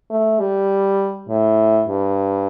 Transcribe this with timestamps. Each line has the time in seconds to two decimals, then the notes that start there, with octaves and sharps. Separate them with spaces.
0.10 A3
0.40 G3
1.29 A2
1.88 G2